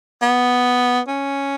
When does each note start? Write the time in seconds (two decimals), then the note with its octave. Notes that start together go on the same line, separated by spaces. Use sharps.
0.22 B3
1.08 C#4